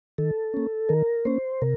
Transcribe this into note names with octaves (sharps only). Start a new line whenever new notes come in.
D#3 A4
A#3 C#4
D#3 A#4
A#3 C#4 C5
C3 A#4